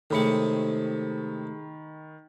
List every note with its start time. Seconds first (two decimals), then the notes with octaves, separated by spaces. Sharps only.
0.10 A2 C3 D#3 G#3 B5 C#7